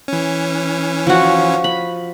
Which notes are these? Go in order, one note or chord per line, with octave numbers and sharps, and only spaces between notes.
E3 C#4
F3 F#4
B5